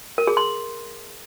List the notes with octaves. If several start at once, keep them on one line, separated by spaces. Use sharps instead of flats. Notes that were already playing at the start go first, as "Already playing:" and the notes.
A#4
G#4
C6